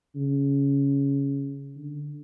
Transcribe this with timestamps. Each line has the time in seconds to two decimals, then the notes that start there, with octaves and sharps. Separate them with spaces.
0.16 C#3
1.76 D3